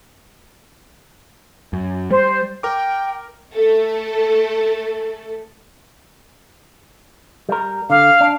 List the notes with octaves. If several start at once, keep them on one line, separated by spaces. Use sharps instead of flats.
F#2
G3 C5
A#4 G5 D6
A3 A4
G3 A#4
D3 F5
D4